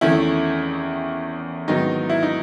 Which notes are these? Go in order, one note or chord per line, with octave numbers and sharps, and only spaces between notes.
E2 D#3 A3 C#4 E4
G#2 D#3 F#3 B3 D#4
E4
D#4